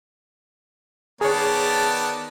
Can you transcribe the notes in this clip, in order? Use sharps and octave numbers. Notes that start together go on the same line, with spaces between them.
D#3 B3 G#4 C#5 D5 A5